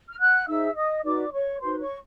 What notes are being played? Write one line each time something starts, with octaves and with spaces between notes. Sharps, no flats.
F6
F#5 F#6
D#4 G#4 C5 E5 E6
D#5 D#6
D#4 F#4 B4 D5 D6
C#5 C#6
D#4 F#4 B4 C5 C6
C#5 C#6